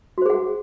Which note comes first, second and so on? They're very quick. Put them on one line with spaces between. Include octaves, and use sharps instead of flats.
F#4 C5 G#4 F#5